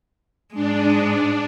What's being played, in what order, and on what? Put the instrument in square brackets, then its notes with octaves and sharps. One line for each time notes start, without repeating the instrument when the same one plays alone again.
[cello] G#2 G#3 [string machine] D4